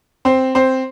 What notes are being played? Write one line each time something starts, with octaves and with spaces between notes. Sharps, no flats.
C4 C5
C4 C5